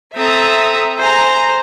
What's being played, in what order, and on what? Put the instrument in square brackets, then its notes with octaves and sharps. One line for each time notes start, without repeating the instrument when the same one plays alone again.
[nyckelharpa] C4 A4 [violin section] E5 A#5 D#6
[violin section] G#4 A#5 [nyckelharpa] C5